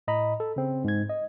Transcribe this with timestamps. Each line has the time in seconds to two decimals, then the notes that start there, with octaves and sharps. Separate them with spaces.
0.08 A2 D#5 A#5 B5
0.40 A4
0.56 C#3 C4
0.84 G#2 G#6
1.10 D#5